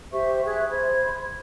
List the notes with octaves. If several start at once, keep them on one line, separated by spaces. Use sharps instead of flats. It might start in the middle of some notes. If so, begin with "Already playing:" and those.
G4 C5 E5 C#6
G#4 E5 F#6 G#6
C5 B5 G#6